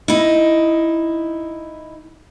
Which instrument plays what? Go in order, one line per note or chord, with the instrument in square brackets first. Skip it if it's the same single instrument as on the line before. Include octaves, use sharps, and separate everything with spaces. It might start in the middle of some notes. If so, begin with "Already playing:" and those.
[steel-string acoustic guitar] D#4 E4